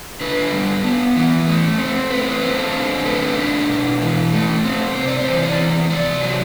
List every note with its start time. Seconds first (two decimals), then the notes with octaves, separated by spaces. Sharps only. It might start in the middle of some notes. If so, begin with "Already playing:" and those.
0.21 D3 B4
0.52 G3
0.84 B3
1.16 E3
1.47 A3
1.78 C4
2.11 A3 B4
2.42 C4
2.58 A4
2.74 D3
3.05 A3 B4
3.36 D4
3.69 B2
4.01 E3
4.32 A3
4.64 C4
4.95 C3 C5
5.08 D5
5.19 C5
5.27 E3
5.43 D5
5.59 E2
5.90 C3 D5
6.21 F#3